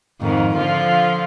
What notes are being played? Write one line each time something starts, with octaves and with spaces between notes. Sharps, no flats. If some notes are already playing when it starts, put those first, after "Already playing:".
F2 G#2 D#3
D3 F3 F4